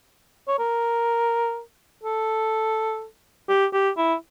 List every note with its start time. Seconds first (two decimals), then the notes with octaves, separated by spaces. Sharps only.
0.48 C#5
0.59 A#4
2.04 A4
3.49 G4
3.73 G4
3.97 E4